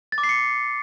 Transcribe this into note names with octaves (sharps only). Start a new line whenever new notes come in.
A6
D6
C7
C#7